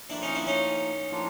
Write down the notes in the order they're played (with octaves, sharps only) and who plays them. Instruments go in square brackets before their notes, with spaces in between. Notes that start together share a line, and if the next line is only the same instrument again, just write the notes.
[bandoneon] A2 F3 A#3 [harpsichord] D4 E4
[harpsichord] C#4 D#4
D4 E4
C#4 D#4
[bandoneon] A2 F3 A#3 D4 F4